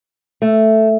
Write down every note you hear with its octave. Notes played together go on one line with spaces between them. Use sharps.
A3